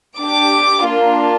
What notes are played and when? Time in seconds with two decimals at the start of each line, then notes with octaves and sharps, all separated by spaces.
0.19 D4 G4 D6
0.85 A#3 D4 F4